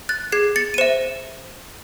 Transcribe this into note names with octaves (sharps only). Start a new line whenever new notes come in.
F#6 A6
G#4 G#6 C7
A6 C#7
D#7
C5 E5 C#7 E7